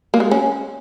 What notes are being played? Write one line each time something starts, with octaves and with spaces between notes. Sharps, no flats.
A#3
G#3
C#4